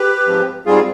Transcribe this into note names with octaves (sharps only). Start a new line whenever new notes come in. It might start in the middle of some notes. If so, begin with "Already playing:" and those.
Already playing: G4 B4
G#2 F3 C4
G#2 G3 C4 F4 G#4